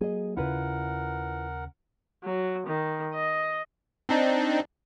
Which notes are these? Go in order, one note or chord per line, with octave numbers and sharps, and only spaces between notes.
F#3 A#3 G#4 D#5
D#2 C#3 E4 F4 A#4 B4 F#5
F#3
D#3
D#5
C4 D4 D#4